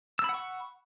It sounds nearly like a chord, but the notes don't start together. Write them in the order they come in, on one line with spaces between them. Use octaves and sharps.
E6 B5 F#5 C#6